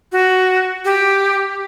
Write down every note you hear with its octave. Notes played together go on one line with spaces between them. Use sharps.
F#4
G4